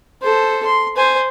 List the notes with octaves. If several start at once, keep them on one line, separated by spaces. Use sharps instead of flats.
A4 C5
C6
C5 G#5